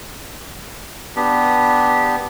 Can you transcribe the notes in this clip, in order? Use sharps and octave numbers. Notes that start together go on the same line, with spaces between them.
B3 D4 G4